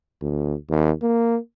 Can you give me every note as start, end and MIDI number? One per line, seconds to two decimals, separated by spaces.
0.22 0.55 38
0.69 0.92 39
1.02 1.37 58